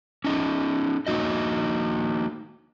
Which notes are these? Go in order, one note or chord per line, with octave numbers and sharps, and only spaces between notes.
C#4 D#4 G#4
A#3 D#4 F#4 D#5